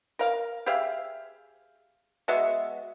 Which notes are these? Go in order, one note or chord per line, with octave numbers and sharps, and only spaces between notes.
A#4 F5
G4 G#4 E5 F5
G#3 B3 F#4 E5